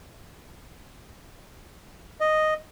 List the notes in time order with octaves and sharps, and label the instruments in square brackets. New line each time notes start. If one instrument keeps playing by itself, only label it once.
[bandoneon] D#5